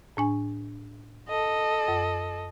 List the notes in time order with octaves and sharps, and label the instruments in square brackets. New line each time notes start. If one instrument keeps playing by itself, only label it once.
[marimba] A2 D4 G#5
[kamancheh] A4 D#5
[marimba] F#2